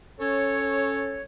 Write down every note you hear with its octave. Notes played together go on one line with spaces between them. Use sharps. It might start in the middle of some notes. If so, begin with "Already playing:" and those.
C#4 A4 C#5